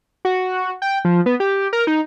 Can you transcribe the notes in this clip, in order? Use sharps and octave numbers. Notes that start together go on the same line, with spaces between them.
F#4
G5
F3
B3
G4
A#4
D#4